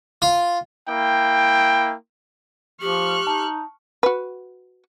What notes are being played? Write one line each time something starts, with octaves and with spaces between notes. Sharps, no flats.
F4
A#3 E4 G5
F3 G4 C#6 F6 F#6
D#4 A5
F#4 B4